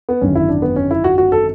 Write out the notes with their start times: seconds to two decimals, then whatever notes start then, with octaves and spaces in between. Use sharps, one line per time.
0.09 B3
0.21 G#1 F#2 D3 F#3 C#4
0.35 E4
0.49 D4
0.62 B3
0.76 C#4
0.91 E4
1.04 F#4
1.18 F#4
1.32 A4